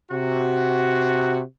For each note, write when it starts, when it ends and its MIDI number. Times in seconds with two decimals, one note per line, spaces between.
0.11 1.41 48
0.11 1.41 66